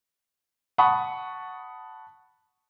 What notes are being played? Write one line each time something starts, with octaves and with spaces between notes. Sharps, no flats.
F#5 A5 B5 C#6 D#6